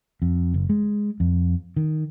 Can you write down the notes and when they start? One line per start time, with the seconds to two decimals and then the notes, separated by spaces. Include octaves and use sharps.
0.22 F2
0.54 F#1
0.69 G#3
1.20 F2
1.76 D#3